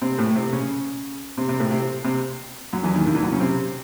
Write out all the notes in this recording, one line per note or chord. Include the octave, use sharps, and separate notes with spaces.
C3 C4
A2 A3
C3 C4
C#3 C#4
C3 C4
C3 C4
A2 A3
C3 C4
C3 C4
F#2 F#3
E2 E3
D#2 D#3
D#2 D#3
E2 E3
F#2 F#3
C#3 C#4
C3 C4